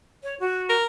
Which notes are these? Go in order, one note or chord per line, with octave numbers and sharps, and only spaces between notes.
C#5
F#4
A#4